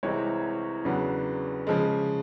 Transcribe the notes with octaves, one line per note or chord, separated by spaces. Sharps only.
C2 C3 E3 G#3 C4 C#5
E2 C#3 F#3 B3 D4
C#3 F3 G#3